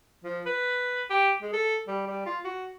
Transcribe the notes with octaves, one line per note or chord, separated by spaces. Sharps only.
F3
B4
G4
G#3
A4
G3
G3
F4
F#4